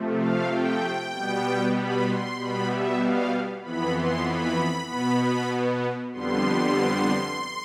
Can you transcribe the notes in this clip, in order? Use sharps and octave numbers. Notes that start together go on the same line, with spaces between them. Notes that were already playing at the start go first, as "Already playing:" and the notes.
Already playing: C3 F3 A3
F5
G5
B2 G3 B3
B5
C6
B2 G3 B3 B5
E5
F5
F2 E3 B3 B5
C6
B5
B2 B3 B5
B5
F2 D3 G3 B3 C6